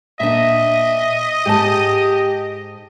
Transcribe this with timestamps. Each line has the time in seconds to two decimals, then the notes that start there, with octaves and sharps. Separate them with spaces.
0.20 A#2 D4 D#5 E5
1.46 G#2 G4 A5